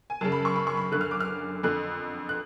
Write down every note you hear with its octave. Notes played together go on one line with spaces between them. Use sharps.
G#5
F#2 C#3 A5
B5
C#6
B5
C#6
B5
F#2 D3 F#6
F6
D6
F6
F2 D3 F#6
F#6